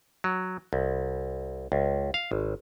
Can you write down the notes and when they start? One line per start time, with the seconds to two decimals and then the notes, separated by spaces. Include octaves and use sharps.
0.24 F#3
0.73 C2
1.72 C#2
2.14 F5
2.32 G#1